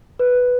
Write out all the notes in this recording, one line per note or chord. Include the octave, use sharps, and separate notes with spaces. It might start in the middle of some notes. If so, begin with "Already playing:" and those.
B4